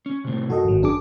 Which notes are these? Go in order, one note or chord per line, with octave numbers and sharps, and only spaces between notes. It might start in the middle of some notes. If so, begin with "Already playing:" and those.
C#4
A2 C3
F#2 F#4 A4 D#5
G#1 F#3
D4 G#4 D6